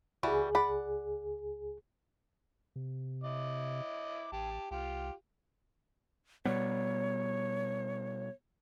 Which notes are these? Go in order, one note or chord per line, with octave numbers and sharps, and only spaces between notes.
C#2 E3 G3 F#4 G#4
D5 F#5 B5
C3
E4 D#5 D6
A1 G4 A5
C2 F4 G4
B2 G3 B3 C#5